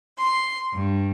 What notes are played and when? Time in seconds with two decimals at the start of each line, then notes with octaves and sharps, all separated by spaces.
0.19 C6
0.72 G2